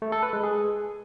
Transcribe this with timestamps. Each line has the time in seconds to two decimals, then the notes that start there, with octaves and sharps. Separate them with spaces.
0.02 A3
0.12 A4
0.23 B4
0.33 G#3
0.43 G#4